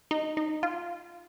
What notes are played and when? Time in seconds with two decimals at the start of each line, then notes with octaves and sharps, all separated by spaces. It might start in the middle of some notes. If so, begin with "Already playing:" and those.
0.11 D#4
0.37 D#4
0.63 F4